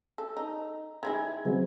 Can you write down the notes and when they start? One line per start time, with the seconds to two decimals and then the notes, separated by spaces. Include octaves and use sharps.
0.18 A4
0.37 D#4
1.03 D#3 G#3 E4 G#6
1.45 C#3 F#3 C4